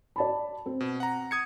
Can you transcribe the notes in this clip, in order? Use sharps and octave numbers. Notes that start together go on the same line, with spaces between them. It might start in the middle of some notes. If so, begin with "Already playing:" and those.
D5 A5 B5
C4
B2
F#5 A#5
D#6 G#6 C#7